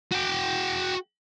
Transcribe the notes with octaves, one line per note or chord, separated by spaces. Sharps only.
F#4 G5